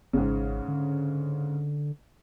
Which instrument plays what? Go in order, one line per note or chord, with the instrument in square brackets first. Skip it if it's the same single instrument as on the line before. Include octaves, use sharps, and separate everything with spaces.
[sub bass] G#1 [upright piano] G#2 C#3
[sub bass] D3